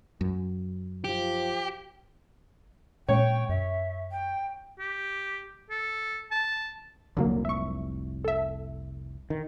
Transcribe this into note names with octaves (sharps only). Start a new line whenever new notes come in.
F#2
F3 G4
A#2 G#3 C#5 G5
F#2 E5
G5
G4
A4
A5
F1 C2 D3 F#3 A#3
E5 C#6
A4 E5
D#3